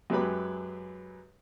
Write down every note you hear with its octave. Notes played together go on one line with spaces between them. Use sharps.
F#2 F#3 G#3 G4 B4 B5